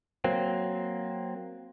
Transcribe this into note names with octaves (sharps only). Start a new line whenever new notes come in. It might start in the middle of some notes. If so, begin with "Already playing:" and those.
F#3 A#3 C4